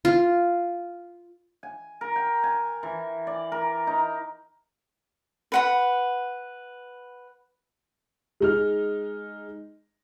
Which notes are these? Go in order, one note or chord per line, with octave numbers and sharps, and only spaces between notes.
F4
G#5
A#4
G5
G#5
E3
D5
A#4
D#4
B4 F#5 B5
G#3 D#4 F6